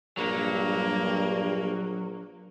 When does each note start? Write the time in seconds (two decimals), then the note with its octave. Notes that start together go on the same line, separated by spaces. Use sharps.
0.17 A#1 G2 F#3 A#3